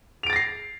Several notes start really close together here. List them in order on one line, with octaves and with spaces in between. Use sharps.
F7 D7 A6 A#6 C7